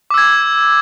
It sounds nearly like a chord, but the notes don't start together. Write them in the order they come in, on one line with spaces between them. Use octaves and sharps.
D6 E6 G#6